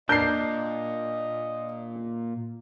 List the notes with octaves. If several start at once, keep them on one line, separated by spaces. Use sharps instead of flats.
A#2 D4 A#4 D#5 G6 C7